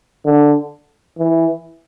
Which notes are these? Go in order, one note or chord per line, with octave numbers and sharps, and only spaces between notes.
D3
E3